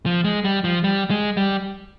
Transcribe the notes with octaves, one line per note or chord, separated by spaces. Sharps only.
F3
G#3
G3
F3
G3
G#3
G3